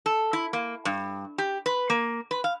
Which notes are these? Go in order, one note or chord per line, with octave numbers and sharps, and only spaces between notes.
A4
E4
A#3
G2
G4
B4
A#3
B4
F5